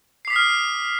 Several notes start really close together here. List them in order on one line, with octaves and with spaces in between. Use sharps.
C7 D6 B6 D#6 F6